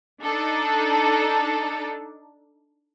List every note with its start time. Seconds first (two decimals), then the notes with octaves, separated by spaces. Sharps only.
0.23 D4 D#4 A4